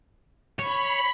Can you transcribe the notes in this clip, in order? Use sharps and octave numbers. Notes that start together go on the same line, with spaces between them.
C#5 B5